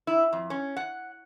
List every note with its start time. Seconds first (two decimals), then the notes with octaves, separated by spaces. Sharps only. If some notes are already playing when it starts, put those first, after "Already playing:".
0.07 E4
0.33 F2
0.50 C#4
0.77 F#5